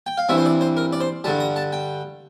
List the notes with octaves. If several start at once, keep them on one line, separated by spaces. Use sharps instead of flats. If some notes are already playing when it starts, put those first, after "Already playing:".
G5
F5
G2 E3 G3 C4 E5
C5
D5
C5
A#4
D5
C5
G2 D3 G3 A5
A#5
A5
G5